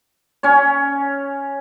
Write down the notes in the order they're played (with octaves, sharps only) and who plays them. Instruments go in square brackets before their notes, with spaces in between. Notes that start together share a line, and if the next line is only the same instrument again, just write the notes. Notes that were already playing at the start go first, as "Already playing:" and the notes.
[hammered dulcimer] C#4 C#5